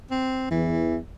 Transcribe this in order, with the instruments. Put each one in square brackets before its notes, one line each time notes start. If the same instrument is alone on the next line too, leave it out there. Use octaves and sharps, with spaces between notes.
[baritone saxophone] C4
[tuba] E2 [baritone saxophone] E3